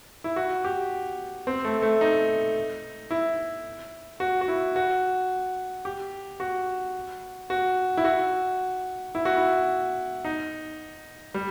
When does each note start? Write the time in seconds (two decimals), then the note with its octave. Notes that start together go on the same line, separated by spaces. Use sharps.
0.24 E4
0.36 F#4
0.64 G4
1.47 C4
1.65 A3
1.82 A3
2.01 D#4
3.11 E4
4.20 F#4
4.41 F#4
4.48 E4
4.76 F#4
5.85 G4
6.40 F#4
7.50 F#4
7.97 E4
8.05 F#4
9.15 E4
9.25 F#4
9.37 E4
10.25 D#4
11.34 G3